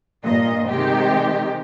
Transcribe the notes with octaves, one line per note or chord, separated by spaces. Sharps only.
G2 A#2 D#5
C3 D#3 G#3 G4